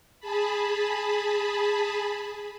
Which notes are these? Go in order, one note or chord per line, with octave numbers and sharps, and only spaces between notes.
G#4 A5 B5